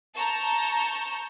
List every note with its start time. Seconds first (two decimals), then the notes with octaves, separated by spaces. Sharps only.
0.15 A5 A#5 C#6 G6